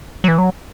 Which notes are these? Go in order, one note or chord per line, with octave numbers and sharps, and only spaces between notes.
F#3
E3
F#3